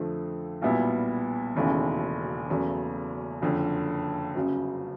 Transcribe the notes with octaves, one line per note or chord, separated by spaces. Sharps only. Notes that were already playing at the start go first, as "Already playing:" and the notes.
Already playing: F2 D3 F3 A3
B1 A#2 G3 B3 E4
E1 D#2 C#3 E3 A3
F#1 E2 C#3 F#3 A3
F#1 F2 D3
G1 F#2 C#3 F#3